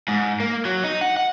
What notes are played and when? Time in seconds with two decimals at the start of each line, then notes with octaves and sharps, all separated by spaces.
0.08 G#2
0.40 A#3
0.65 F#3
0.84 D#4
1.01 F#5
1.17 F#5